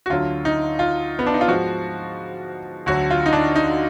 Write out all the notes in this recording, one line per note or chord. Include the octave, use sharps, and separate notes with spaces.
F#4
D2 D3 F#3 F4
D#4
F4
B3
D4
D#4
F4
G#2 F3 F#4
D2 D3 F#3 F#4
F4
D#4
D4
D#4